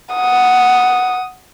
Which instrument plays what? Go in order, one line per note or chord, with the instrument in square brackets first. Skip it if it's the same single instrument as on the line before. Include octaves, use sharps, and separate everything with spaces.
[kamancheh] F#5 D#6